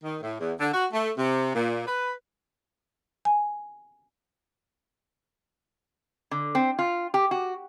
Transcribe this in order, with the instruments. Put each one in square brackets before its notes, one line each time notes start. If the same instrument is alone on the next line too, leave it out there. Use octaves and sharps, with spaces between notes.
[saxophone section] D#3
A2
E2
D3
F#4
A3
C3
A#2
B4
[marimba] G#5
[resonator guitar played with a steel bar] D3
C4
F4
G4
F#4